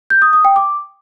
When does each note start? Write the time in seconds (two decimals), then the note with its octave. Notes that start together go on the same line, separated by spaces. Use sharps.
0.10 G6
0.22 D#6
0.33 D#6
0.45 G5
0.56 D6